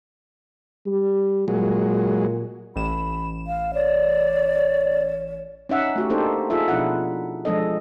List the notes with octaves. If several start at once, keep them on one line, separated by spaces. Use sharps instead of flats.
G3
A#2 F#3 G#3
A1 B5 E7
F5
C#5 D5
C#4 D#4 E5 F#5
A3 F#4 G4
A#3 D4 D#4 G4 A4 C5
D#4 F4 G#4 A4 E5
B2 F3 D4 E4 F4 F#5
F3 G#3 D4 A4 D#5